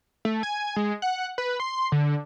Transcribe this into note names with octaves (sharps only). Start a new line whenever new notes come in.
A3
G#5
G#3
F#5
B4
C6
D3